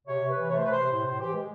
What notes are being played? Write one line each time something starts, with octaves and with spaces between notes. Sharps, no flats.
C3 C#5
C3
B4
E3
A3 C#5
C5
C3 B4
C5
C3
A2 C5
A2 C5
E3 G4
G#3